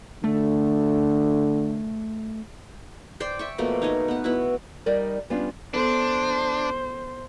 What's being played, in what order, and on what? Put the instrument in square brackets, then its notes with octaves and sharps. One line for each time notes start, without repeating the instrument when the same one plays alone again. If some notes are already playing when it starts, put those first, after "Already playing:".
[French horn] D3 [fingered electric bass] A3
[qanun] C5 D5 G5 C6
E5 G5 C#6
B2 F3 A3 A#3
D#4 C#5 D#5
B3 F#5
B3 E4 F#4
[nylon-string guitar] G3 D#4 A#4 D5 D#5
G3 B3 C#4 D4 F4 F5
[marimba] B3 A4 [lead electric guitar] D4 [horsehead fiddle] C5